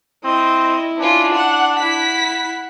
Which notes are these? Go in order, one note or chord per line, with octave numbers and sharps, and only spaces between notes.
C4 E4 D#5
C#4 D4 F4
F#5
E4 F#5 B6